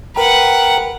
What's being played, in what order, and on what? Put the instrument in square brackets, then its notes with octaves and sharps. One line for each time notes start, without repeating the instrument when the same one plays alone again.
[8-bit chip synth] A#4 G5 A#5 [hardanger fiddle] B4 F#5